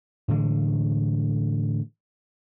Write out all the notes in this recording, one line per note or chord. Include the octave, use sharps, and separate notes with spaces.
A2 D3 E3 G#3